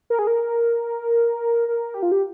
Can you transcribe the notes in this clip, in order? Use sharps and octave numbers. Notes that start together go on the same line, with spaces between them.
A#4
G#4
A#4
A#4
G4
F4
G4